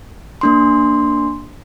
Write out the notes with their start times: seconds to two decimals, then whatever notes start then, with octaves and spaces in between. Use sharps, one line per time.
0.41 A#3 D4 C6